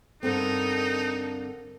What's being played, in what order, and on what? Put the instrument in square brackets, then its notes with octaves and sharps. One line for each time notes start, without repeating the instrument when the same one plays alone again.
[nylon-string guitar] G2 D3 C4 [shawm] D#4 [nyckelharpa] A4 A#4